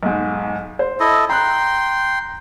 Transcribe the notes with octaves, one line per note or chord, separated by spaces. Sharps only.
B1 G#2
C5
E4 A4 D#5
G5 A#5 C6 F#6